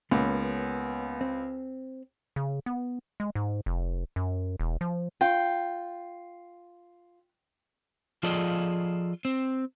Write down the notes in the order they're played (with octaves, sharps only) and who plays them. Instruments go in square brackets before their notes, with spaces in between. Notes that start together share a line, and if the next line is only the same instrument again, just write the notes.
[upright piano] C#2 [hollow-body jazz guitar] A#3 B3 C#4
[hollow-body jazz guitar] C4
[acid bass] C#3
B3
G#3
G#2
F1
F#2
E1
F3
[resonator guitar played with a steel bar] F4 [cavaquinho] G5
[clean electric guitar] F3 F4 G#4 A4 D5 D#5
C4